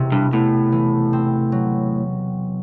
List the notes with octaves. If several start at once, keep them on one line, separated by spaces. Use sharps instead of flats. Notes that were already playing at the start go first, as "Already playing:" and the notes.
Already playing: E1 C3
G2
A2 B3
E3
C4
F#3